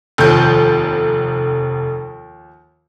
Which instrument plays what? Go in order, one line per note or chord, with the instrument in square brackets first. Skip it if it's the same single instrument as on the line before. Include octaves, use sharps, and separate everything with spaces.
[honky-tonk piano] F1 G6 [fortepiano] D#2 F3